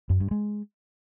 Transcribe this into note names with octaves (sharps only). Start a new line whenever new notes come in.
F#2
G2
G#3